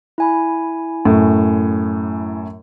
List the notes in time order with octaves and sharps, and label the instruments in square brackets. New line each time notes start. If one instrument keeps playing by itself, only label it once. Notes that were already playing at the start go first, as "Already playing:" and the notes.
[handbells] E4 G#5 B5
[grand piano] F#2 A2